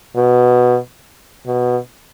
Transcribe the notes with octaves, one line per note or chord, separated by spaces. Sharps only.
B2
B2